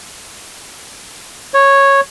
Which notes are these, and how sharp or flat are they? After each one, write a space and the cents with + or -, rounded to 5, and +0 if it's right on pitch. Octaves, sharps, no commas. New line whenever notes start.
C#5 -10